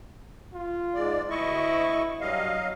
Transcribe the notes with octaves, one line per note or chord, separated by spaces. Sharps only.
F4
G#2 G#3 D5
D2 E4 D#5 C#6
G2 F#3 D#5 F5